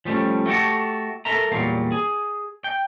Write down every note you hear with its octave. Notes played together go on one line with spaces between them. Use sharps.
F3 G3 A3 C#4
A3 F#4 G4 A4
A4 A#4 E5 A#5
E2 A#2 F#3 G3 F5
G#4
G5